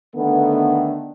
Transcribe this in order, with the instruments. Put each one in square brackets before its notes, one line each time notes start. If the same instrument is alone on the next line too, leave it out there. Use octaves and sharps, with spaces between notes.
[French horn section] D3 D#3 A3 B3